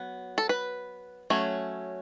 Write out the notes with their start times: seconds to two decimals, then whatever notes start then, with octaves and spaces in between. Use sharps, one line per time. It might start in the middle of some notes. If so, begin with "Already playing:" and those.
Already playing: F#3 B3
0.38 A4
0.49 B4
1.30 F#3 A3 C#4